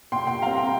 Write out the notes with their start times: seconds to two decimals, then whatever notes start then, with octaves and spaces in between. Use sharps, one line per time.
0.12 A#2 G5 C6
0.27 G5 C6
0.42 G3 C4 F5 A#5
0.57 G5 C6